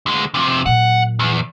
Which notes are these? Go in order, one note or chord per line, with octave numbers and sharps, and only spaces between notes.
D2 G#3
F2 C3
A#2 F#3 F#5
E2